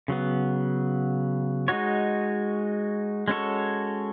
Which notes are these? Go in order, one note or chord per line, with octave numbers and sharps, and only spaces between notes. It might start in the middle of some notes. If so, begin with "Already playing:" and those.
C#3 F#3 B3
G#3 D#4 F#4 C#5
G#3 C#4 F#4 A4 C#5